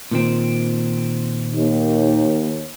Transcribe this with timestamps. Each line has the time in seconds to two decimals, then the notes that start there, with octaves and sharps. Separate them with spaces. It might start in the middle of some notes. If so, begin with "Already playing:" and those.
0.11 A#2 D#3 C4
1.54 D#2